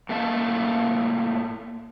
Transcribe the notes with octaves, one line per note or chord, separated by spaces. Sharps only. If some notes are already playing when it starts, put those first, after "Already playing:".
A2 A3 A#3 E5 G#5 A5